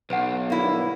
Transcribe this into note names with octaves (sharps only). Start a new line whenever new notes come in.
B1 B4 F#5
G2 D3 A#3 B3 E4